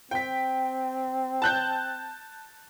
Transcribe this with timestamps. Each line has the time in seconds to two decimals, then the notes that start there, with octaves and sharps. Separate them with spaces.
0.11 C4 G5 B6
1.42 A5 F#6 G6